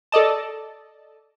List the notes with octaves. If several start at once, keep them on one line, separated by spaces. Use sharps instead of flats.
A4 D5 D#5 A5